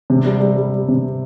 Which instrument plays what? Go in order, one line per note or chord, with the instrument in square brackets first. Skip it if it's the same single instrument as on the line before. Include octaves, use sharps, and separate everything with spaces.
[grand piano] C3
G3
G3
G3
G3
C3